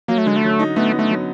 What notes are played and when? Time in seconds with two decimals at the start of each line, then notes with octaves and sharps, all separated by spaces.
0.08 F#3 A#3
0.18 A3
0.26 D3 G#3
0.36 A3
0.43 F#3
0.59 D#4
0.76 A3 B3
0.93 D#4
0.99 A3
1.10 F#3